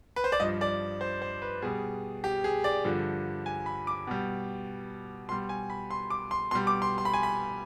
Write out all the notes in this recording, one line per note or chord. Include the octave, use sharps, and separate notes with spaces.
B4
C5
D5
G2 F3 D#5
D5
C5
C5
B4
B2 G3 G#4
G4
G#4
D5
G2 D3 F3
G#5
B5
D6
B2 G3
B2 G3 C6
G#5
B5
C6
D6
C6
B2 G3 C6
D6
C6
C6
B5
G#5
B5